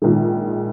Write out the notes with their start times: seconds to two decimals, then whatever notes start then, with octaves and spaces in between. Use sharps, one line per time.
0.02 A#1 G#2 D#3 G#3